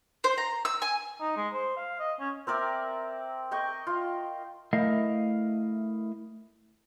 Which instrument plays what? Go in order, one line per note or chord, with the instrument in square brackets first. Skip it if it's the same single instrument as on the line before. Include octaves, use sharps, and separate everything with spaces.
[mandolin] C5
A#5
E6
G#5
[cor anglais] D#4
G#3
C5
F5
D#5
C#4
[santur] C4 A#4 D5 E5
D#5 G5 C#6
F4
[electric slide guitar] A3 E4 A#4 D#5 F5